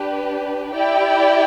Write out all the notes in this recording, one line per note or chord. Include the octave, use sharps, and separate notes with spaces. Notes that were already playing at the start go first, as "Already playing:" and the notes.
Already playing: D4 G4 B4
E4 G4 D5 G5